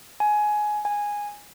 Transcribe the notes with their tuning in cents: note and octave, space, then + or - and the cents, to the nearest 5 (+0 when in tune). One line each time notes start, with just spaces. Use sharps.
G#5 +15
G#5 -10